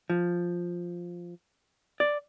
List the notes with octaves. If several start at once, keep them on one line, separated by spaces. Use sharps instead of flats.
F3
D5